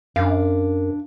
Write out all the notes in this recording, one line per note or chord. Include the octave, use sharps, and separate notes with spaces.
F#2 D4 F5